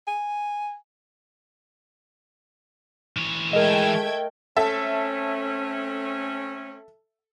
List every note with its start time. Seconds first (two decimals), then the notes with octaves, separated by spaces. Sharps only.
0.07 G#5
3.17 E3 C#5
3.53 G#3 A3 A#4 D#5 G5 G#6
4.57 A3 C4 C#4 A4 E5